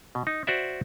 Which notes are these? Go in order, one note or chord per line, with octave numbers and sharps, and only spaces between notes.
B2
D#4
F#4 C5 D5 E5